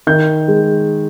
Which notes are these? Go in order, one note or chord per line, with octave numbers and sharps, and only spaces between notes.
D#3 G6
G#3